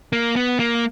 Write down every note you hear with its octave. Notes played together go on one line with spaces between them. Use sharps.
A#3
B3
A#3